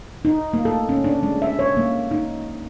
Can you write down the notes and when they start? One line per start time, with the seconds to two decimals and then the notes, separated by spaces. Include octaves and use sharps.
0.25 D#4
0.53 A#3
0.65 A4
0.89 C#4
1.04 D4
1.23 G#3
1.42 E5
1.59 C#5
1.77 A#3
2.11 D#4